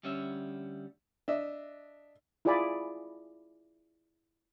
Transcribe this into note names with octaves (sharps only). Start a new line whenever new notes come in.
D2 G3 C#4 C#5 E5
D4 D#5 E5
E4 F4 G#4 D5 G#5 B5